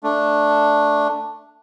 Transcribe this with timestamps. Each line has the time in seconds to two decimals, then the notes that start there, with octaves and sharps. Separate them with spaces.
0.03 A3 D4